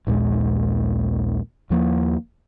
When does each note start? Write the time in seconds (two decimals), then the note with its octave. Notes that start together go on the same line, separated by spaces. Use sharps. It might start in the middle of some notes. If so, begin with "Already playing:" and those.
0.07 A#1 D#2 A#2 G#3
1.70 D#2 F3 A#3